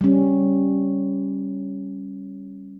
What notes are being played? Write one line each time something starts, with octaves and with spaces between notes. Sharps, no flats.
G3 C#4